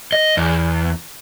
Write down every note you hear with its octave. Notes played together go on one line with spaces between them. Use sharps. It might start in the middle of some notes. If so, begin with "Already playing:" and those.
D#5
E2